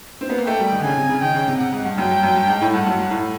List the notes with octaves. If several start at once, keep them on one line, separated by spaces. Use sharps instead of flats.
C4
B3
A#3
A3 G5
G3
D#3
D3
C#3 G#5
C3
C#3
D#3 G5
C#3
C3
C3 F#5
G#2
G2
F#2 G5
G2
F#2
G2
G#2
A2
G2 F#5
F#2
G2
A2